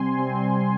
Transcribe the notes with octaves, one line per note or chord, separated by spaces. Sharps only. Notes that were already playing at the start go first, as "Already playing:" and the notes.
Already playing: C3 G3 C4 G#5 C6
C3 G3 C4